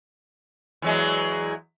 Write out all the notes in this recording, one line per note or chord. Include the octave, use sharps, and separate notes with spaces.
E2 F#3 G#3